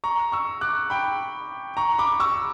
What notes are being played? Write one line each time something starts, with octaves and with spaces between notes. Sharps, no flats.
A#5 C#6
C#6 E6
D6 F#6
G5 B5
A#5 C#6
B5 D6
C#6 E6